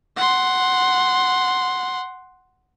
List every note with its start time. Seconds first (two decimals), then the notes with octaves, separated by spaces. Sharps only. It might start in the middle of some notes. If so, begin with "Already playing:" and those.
0.16 F#5 C6